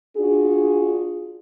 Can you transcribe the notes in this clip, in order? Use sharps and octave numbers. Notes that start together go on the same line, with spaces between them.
D4 F4 F#4 G#4